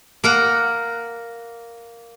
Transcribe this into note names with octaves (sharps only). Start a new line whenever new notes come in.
A#3 A#4 F#5